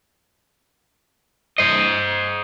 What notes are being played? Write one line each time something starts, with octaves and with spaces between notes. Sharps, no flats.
C5 D#5